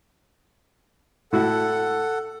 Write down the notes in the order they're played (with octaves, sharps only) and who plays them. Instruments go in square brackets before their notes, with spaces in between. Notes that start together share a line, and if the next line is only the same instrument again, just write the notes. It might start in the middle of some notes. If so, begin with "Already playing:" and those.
[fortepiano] A2 E4 F#4 [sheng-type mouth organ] A4 F#5